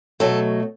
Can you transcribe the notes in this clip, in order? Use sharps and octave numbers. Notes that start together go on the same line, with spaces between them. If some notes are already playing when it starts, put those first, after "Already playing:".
B2 F#3 A3 A4